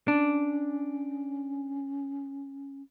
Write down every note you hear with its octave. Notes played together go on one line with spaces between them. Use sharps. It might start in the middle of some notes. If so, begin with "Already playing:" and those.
C#4 D4